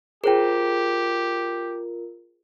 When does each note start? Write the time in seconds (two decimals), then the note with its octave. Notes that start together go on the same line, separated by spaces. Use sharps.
0.24 F4 G4 G#4 A#4 C5 G5